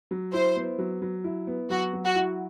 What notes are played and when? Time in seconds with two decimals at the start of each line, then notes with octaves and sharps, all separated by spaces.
0.11 F#3
0.33 E4 C5
0.56 B3
0.78 F#3
1.02 F#3
1.24 E4
1.47 B3
1.70 F#3 F#4
1.93 F#3
2.05 F#4
2.15 E4